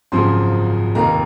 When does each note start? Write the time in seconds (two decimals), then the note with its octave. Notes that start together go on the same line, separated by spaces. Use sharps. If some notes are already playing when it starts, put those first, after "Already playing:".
0.12 G#1 F#2 C#3 F3 C6
0.95 F1 D#2 D#3 A#3 A#5